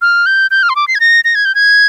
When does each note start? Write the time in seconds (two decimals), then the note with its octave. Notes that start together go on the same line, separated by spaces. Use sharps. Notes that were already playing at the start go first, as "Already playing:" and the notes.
0.02 F6
0.26 G6
0.51 G6
0.63 F6
0.70 C6
0.76 D6
0.88 C7
0.95 G#6
1.00 A#6
1.25 A#6
1.35 G#6
1.45 G6
1.55 G#6